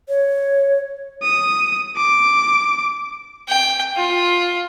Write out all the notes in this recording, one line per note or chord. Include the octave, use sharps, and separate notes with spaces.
C#5
D#6
D6
G5
F4